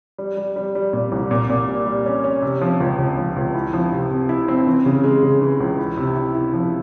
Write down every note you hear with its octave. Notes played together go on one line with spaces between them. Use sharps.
G3
G3
G3
G3
A#2
C2
A#2
A#2
G3
G3
C#4
C#4
C3
F3
C#2
C#2
F3
C#2
E4
F3
C3
C3
E4
C4
E3
C#3
G#3
C#3
E3
C#2
E4
C3
E4
E4
F3